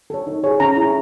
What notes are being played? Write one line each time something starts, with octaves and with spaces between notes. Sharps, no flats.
A4 C#5
D#4
G#4 C#5
C#4 A#5
E4 G#4